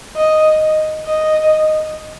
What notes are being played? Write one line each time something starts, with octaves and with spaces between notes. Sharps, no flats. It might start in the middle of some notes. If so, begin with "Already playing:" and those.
D#5
D#5